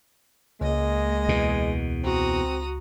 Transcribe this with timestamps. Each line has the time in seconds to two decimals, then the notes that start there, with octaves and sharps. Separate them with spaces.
0.61 C#2 G#3 A#3 D#5
1.29 E2 B2
2.03 C4 F#4 A#5 D#6